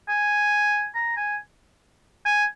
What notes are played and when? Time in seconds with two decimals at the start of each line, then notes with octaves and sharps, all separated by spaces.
0.09 G#5
0.95 A#5
1.17 G#5
2.25 G#5